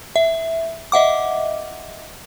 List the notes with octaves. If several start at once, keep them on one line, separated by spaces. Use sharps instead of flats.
E5
D#5 E5 F#5 D6